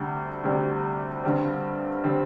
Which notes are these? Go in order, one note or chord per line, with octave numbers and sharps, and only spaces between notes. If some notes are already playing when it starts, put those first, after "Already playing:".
Already playing: D2 C3 G3 D4
D2 C3 G3 D4
G2 D3 G3 C4
D3 G3 C4